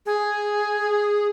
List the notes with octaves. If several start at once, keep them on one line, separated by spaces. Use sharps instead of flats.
G#4